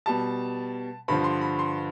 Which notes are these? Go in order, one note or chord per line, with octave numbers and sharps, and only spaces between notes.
B2 G3 A5
G2 D3 F3 B5
C6
B5
C6